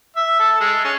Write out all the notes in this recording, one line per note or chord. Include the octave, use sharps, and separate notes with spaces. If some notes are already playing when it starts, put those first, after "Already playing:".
E5
A4
G#3
C#4